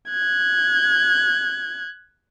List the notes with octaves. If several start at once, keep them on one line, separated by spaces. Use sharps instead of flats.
F#6 G#6